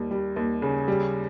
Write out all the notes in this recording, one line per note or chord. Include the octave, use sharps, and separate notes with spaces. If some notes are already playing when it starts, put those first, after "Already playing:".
Already playing: D#2 G3
G3
D#2
C#3
G3